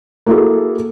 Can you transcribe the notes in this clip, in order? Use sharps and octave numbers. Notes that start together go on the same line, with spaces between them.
A#3 E4 F#4 G#4 A4